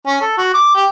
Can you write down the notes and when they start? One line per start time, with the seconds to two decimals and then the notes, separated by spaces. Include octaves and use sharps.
0.06 C#4
0.21 A4
0.38 F#4
0.54 D6
0.75 G4